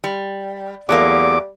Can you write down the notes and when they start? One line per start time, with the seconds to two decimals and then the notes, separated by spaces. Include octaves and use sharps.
0.04 G3
0.89 E2 F#3 G3 A3 A#3 D6